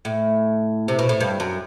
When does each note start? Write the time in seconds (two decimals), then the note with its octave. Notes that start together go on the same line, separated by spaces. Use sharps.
0.05 A2
0.88 C3
0.99 B2
1.09 A2
1.21 G2
1.40 F#2